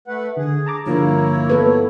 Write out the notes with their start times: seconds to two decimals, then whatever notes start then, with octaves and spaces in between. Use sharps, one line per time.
0.08 A3 B4 F#5
0.37 D3 G#4
0.66 A5 A#5 D6
0.86 G2 D3 F3 A#3 E4 C#5
1.49 B3 A4 B4